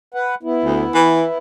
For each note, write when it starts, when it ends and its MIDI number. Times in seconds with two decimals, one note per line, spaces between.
0.14 0.35 71
0.14 0.35 78
0.43 1.38 59
0.43 1.38 64
0.65 0.85 38
0.94 1.24 52